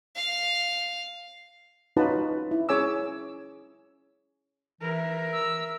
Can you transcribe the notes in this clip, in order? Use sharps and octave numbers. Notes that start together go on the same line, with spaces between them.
F5
C#4 D#4 F4 F#4 B4 A5
E4
C#4 G#4 C#5 G#5 D6 E6
E3 A#4 E5
E6